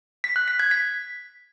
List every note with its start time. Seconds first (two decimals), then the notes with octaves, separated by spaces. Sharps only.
0.24 B6
0.36 F#6
0.48 B6
0.59 G#6
0.71 B6